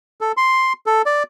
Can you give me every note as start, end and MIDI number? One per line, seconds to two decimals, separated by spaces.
0.21 0.32 69
0.37 0.73 84
0.86 1.02 69
1.06 1.23 74